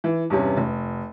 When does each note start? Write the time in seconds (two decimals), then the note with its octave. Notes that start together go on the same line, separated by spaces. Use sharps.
0.04 E3
0.30 E2 G2 C3 C#4
0.57 F1